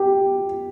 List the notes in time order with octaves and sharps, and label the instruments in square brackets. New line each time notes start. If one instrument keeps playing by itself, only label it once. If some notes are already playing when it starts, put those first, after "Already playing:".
Already playing: [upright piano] G4